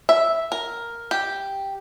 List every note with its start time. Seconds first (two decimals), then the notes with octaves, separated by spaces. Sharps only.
0.09 E5
0.52 A#4
1.11 G4